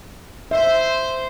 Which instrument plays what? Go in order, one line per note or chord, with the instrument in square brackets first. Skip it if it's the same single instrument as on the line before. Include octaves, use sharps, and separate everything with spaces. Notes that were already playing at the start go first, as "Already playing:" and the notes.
[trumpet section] C5 [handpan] E5